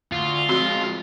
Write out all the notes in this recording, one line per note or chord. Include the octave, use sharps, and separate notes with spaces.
D2 F4
F3 G#3 C4 F#4 C6